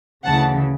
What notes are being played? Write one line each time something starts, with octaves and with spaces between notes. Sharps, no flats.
D2 C#3 E3 F#5 A5